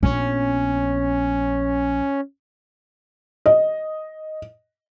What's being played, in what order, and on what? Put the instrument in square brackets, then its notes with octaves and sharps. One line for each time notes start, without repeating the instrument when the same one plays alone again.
[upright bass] A#1 B3 [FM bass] C#4
[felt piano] D#5